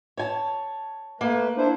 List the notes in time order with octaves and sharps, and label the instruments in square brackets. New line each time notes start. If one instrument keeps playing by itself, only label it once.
[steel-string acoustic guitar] C#5 G#5 A5
[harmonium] A3 B4 [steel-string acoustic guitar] A#3
[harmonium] D4 E4 C5